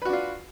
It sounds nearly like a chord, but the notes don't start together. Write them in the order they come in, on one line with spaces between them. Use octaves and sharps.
B4 F#4 D4 F4